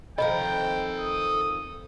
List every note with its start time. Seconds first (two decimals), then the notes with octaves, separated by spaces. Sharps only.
0.18 C3 D#3 F3 A4 D#5 G5 A#5 B5
1.00 D#6